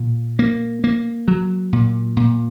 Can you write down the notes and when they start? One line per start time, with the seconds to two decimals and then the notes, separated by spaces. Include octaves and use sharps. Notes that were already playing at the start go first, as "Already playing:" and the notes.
Already playing: A#2
0.39 A#3
0.84 A#3
1.28 F#3
1.73 A#2
2.17 A#2